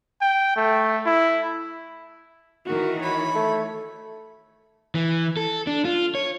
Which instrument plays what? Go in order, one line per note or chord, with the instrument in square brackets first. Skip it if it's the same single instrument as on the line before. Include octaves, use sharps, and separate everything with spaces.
[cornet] G5
A3
E4
[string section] D#3 E3 [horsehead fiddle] F#4 A#4
[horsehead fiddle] C#5 [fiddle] B5
[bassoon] A3
[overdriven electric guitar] E3
A4
D4
F4
C#5